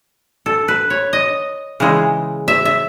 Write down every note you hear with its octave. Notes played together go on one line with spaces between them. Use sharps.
A4
B4
C#5
D#5
C#3 E3 G#3
E5
E5